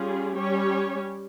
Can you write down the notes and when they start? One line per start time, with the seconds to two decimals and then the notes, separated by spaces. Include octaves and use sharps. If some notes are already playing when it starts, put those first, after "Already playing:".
Already playing: G3 C#4 F4 G#4
0.36 G3 C#4 G4 C#5